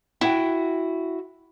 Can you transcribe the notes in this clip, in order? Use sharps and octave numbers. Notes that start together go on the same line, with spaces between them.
E4 F#4 F#5 G5